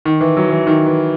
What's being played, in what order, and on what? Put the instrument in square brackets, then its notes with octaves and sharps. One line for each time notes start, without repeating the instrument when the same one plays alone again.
[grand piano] D#3
E3
F#3
E3
D#3
E3